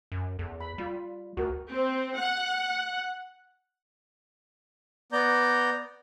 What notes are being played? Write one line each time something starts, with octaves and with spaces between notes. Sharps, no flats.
F#2
E2 A4
B5
G3 F4 B5
D2 F#4 A#4
C4
F#5
B3 D5 A#5 G6